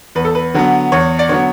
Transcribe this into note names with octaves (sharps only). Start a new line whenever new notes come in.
E2 B4
A4
B4
D3 F#3 B3
E2 C#5
D5
D3 F#3 B3 C#5